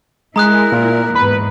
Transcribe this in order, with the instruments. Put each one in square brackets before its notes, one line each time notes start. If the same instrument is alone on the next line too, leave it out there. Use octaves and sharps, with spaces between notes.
[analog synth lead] G#3 [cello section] E4 A#4 [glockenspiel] A#5 D#6 F#6
[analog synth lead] A#2
[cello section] E2 G#2 [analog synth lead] B4